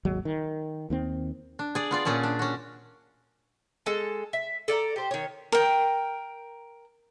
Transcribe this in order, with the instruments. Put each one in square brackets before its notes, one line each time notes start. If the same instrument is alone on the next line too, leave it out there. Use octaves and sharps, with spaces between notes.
[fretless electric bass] G#1 D#2 F#3 G#3
D#3
D#2 D#3 C4
[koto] D4
G#4 D5
B3 F4 D5
A#2 C#4 G#4 A5
D4
C#4 F#4
[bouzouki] G#3 A4 A5
E5
A4 D5 F5 A#5
G4 C5
D#3 C#5
[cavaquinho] A#4 G5